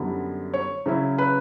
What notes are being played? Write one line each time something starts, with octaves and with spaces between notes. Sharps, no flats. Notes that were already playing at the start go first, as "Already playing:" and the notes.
Already playing: F#2 D3 G3 B3 E4
C#5
C#3 F#3 C#4 E4
B4